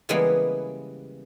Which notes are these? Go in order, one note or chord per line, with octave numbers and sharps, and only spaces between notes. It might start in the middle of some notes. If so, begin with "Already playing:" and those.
C#3 E3 G3 G#3 A#3 B3